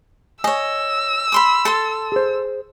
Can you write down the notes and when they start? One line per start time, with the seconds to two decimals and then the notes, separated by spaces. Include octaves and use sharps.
0.44 C#5 D#5 G#5 E6
1.32 B5 C6 D6
1.65 A4 A5 C6
2.12 G#4 C5